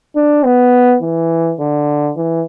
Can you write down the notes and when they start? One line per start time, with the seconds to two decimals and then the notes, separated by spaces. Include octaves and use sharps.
0.16 D4
0.45 B3
1.02 E3
1.60 D3
2.17 E3